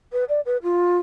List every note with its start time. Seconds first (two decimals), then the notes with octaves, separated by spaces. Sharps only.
0.13 B4
0.29 D5
0.46 B4
0.63 F4